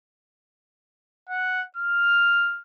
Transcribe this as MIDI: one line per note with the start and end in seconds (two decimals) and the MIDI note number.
1.30 1.62 78
1.77 2.61 89